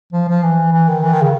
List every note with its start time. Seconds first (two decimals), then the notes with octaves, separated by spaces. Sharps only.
0.13 F3
0.28 F3
0.43 E3
0.72 E3
0.88 D#3
1.03 E3
1.13 D#3
1.22 C#3